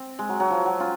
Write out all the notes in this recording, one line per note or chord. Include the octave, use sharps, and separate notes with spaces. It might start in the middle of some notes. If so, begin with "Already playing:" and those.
Already playing: C4
G#3
F#3
F#3
F3
F#3
C#4 F4